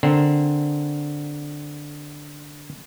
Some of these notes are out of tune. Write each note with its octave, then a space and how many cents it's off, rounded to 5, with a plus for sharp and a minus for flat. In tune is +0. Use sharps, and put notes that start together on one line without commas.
D3 +0 C4 +0 A#4 +0